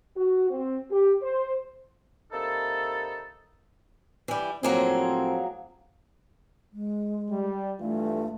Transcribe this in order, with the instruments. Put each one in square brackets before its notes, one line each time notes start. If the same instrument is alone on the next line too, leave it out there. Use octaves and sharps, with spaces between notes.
[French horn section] F#4
C4
G4
C5
[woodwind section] C3 A#3 D#4 E4 A4
[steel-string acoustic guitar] E3 G3
[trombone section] A2 F3 C4 [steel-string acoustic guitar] F#3 A#3 G#4
[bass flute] G#3
[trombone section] G3
[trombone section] G2 E3 F4 [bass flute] A3